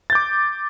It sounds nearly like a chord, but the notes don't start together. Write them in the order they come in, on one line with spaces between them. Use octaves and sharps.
A6 G6 D6